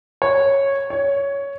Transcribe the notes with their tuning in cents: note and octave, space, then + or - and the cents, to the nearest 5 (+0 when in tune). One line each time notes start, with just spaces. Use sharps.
C#5 -10
C#5 +10